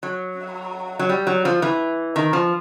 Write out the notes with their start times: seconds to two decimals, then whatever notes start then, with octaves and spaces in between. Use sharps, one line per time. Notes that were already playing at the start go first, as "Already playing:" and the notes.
0.03 F#3
0.99 F#3
1.09 G3
1.27 F#3
1.45 F3
1.62 E3
2.16 D#3
2.33 F3